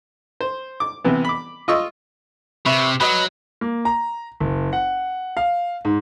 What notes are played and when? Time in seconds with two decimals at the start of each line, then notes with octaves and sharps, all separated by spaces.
0.41 C5
0.80 D6
1.04 C3 E3 B3
1.25 B5 D6
1.68 F4 D#5 C#6 E6
2.66 C3 B4 E5 C#6
3.00 F#3 B4 D#5
3.61 A#3
3.85 A#5
4.40 F#1
4.73 F#5
5.37 F5
5.85 G#2